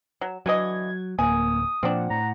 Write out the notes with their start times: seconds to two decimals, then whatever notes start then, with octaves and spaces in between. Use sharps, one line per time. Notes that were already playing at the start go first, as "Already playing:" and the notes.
0.21 F#3
0.46 D3 E3 F#3 D#5 G#6
1.19 D1 A#3 G#5 D#6
1.83 A#2 F3 C4 D4 F#5
2.10 A2 A#5